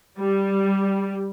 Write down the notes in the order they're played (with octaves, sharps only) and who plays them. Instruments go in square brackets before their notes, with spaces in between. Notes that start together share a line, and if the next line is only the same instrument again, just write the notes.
[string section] G3